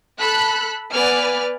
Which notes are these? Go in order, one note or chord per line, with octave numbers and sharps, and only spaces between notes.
A4 B5 F#6
B3 B4 D5 G#5 F6